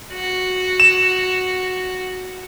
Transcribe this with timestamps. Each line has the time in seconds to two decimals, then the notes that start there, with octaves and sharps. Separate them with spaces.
0.12 F#4
0.80 E7